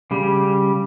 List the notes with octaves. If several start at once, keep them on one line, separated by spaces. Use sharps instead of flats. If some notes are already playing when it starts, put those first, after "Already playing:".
C#3 G3